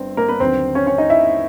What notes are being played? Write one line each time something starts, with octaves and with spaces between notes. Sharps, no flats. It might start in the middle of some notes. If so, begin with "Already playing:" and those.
Already playing: G1 G2 C4
A#3 A#4
B3 B4
D#2 D3 F#3 C4 C5
C#4 C#5
C#4 C#5
D#4 D#5
E4 E5